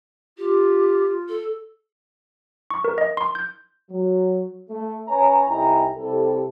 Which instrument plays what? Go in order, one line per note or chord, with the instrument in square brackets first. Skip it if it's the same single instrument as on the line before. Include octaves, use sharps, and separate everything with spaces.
[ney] F4 [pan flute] G4
[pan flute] A4
[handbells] C#6
A#4
D#5
C6
G6
[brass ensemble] F#3
A3
C#4 B4 C#5 G#5 A#5
C2 D#4 E4 G5 G#5 A#5
C3 G3 C4 E4 A4